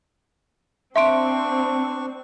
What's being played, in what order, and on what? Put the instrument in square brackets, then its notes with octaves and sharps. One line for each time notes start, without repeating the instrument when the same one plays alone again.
[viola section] C4 [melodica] D4 C#6 [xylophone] E5 C6 D7